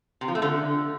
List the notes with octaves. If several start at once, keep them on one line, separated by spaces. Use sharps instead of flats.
C3
F3
A3
D3